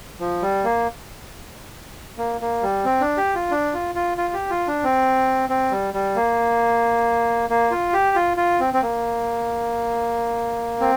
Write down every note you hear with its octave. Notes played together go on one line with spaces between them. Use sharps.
F3
G3
A#3
A#3
A#3
G3
C4
D4
G4
F4
D4
F4
F4
F4
G4
F4
D4
C4
C4
G3
G3
A#3
A#3
F4
G4
F4
F4
C4
C4
A#3
C4